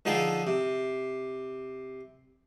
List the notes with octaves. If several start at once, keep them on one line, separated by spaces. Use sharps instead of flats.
D3 F3 D#4 G#4 A4 G5
C3